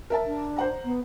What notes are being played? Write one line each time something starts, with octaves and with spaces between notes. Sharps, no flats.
A#4 E5 A5
D4
C5 F#5 A#5
B3